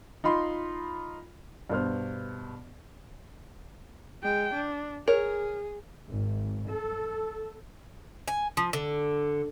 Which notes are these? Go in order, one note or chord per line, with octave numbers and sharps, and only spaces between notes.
D#4 F4 B5 C6
G2 B2 B3 C5 F6
G#3 G5
D4
G#4 A#4 C#5
G#1
A4
G#5
F3
D3